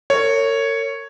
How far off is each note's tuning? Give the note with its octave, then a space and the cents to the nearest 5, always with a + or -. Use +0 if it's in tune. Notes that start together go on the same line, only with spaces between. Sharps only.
A#4 -40 C#5 +0